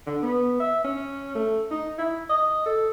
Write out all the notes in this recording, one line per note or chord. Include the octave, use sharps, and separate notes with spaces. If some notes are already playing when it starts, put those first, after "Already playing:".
D3
B3
E5
C#4
A3
D#4
E4
D#5
A4